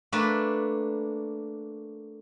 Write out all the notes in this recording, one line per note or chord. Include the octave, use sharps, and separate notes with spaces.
A3 A#3 D4 B4